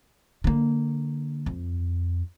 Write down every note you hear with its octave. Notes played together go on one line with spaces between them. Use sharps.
D3 A#3
F2